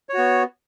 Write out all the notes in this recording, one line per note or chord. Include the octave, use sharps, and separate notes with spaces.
B3 F#4 C#5